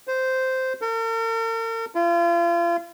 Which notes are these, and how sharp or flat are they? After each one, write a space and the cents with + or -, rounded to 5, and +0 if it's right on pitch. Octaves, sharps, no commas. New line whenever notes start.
C5 -10
A#4 -45
F4 -35